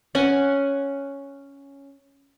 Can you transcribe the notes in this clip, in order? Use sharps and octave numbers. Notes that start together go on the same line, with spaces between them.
C#4 F#5 G#5